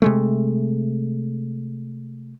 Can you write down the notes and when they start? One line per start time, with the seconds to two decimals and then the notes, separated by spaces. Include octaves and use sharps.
0.02 C3 G#3 A3